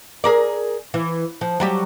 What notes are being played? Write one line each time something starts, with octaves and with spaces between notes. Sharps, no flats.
G#4 A#4 D5
E3
F3
F#3 G3 G4